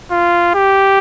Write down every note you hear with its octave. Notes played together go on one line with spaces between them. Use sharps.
F4
G4